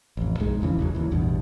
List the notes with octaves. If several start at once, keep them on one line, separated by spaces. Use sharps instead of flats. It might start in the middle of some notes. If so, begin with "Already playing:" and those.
A1 F2
B1 F2 G#2 G#3
D1 F2 C#3 E3
G#1 E2 F#3
D#2 E3
A1 E2 G2 B2